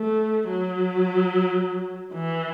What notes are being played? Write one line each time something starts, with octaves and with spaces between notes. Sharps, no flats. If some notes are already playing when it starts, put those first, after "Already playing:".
Already playing: A3
F#3
E3